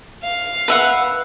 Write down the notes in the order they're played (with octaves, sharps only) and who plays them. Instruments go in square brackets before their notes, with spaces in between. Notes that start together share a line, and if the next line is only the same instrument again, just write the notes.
[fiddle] F5
[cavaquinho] B4 E5 F#5